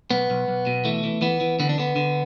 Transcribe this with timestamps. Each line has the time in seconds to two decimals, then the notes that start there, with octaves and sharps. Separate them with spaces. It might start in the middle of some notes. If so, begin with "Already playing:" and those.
0.11 B1 B3
0.30 B1
0.48 B1
0.67 B2
0.85 E3 A3
1.04 E3
1.22 E3 B3
1.41 E3
1.60 D3 B3
1.69 D4
1.78 D3 B3
1.96 D3